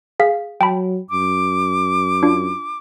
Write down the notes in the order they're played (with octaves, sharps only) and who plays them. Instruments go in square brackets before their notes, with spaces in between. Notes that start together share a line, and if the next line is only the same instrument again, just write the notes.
[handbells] G#4 F5 B6
[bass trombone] F#3 [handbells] G5 A5 B5
[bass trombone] F#2 [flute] D6
[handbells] D4 F4